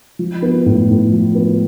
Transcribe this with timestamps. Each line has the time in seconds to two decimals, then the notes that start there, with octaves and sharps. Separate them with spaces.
0.19 F3
0.42 B3
0.66 A2
0.90 A2
1.13 F3
1.35 B3